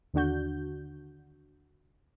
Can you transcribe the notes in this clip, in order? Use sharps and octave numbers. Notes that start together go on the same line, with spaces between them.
D#2 D3 D4 F#4 G6